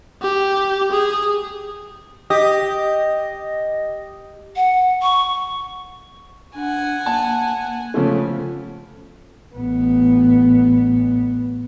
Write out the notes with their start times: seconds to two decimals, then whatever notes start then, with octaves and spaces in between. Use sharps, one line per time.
0.22 G4
0.91 G#4
2.30 G4 D#5 D#6 A#6
4.56 F#5
5.02 C#6
6.55 D4 F#5 G#5
7.06 A#3 A5
7.94 C#3 F3 A3
9.56 A1 B3